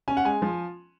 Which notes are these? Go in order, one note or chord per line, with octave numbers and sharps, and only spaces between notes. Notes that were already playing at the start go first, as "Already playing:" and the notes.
C#4 G#5
F#5
G#3 G#5
F3